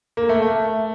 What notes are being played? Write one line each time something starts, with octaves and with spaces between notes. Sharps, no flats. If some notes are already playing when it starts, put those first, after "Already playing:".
A#3
A3
A3